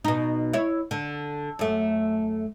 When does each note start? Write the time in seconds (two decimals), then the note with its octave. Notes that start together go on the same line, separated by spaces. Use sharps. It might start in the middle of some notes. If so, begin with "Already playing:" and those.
0.05 B2 D#4
0.53 E4 C#5
0.91 D3
1.59 F#2 A3